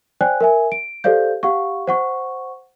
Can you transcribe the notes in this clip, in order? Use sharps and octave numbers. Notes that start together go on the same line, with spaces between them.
C5 D5 G5 G#5 F#6
A#4 E5 G#5
D7
G4 A4 C5 D5 F5 G6
G4 F5 F#5 C#6
C5 F#5 C#6